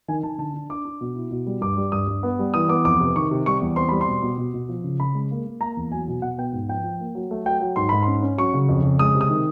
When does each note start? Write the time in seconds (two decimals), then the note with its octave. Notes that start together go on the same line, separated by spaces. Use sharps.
0.08 D#3 G#5
0.23 D#3 A5
0.38 D3 A5
0.54 D4
0.69 D4 D6
0.85 D4
1.01 B2
1.15 E4
1.31 B2
1.46 G3
1.61 G2 D6
1.77 G3
1.92 G2 D#6
2.07 G2
2.23 B3
2.39 G3
2.54 E3 D#6
2.69 B3 D6
2.85 F2 D6
3.00 C3
3.16 D#3 C#6
3.31 C3
3.46 G3 C#6
3.61 E2
3.76 C4 C6
3.89 G3 B5
4.01 C6
4.07 B2
4.22 B2
4.38 B2
4.54 B2
4.69 F3
4.84 C#3
4.99 C#3 B5
5.15 G#3
5.31 A#3
5.45 A#3
5.61 A#3 A#5
5.77 E2
5.92 F#3 G#5
6.08 B2
6.22 B2 F#5
6.38 B3 G5
6.53 G#2
6.68 F3 G5
6.84 F3
7.00 A#3
7.15 F#3
7.31 A3
7.46 F#3 G5
7.61 F#3
7.76 G#2 C6
7.89 G#2 B5
8.02 C#4 C6
8.23 C#4
8.38 F#3 C#6
8.54 C#3
8.68 F2
8.83 C#3
8.99 G#3 D#6
9.15 C3
9.21 D#6
9.30 D#3